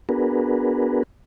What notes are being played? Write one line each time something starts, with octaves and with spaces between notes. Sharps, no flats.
B3 D4 F#4 G#4 A#4 B4